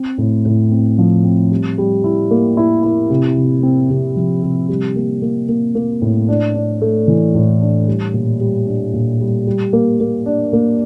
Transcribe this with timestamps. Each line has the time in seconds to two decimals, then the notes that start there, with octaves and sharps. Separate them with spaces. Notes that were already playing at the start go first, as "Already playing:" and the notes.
Already playing: C4
0.18 A2
0.45 A2
0.71 C4
0.99 F3
1.24 C4
1.51 G3
1.78 G3
2.04 E4
2.31 A#3
2.57 E4
2.83 E4
3.10 C3
3.37 C3
3.63 C4
3.90 C3
4.16 F3
4.43 C3
4.69 G3
4.96 A#3
5.22 A#3
5.49 A#3
5.75 A#3
6.02 A2
6.28 D4
6.55 D4
6.81 A3
7.08 E3
7.35 A2
7.61 D4
7.88 G3
8.14 A#2
8.40 G3
8.67 D4
8.93 A#2
9.20 G3
9.47 G3
9.73 A#3
10.00 A#3
10.26 D4
10.53 A#3